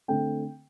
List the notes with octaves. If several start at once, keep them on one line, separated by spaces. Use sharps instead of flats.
D3 A3 C4 G5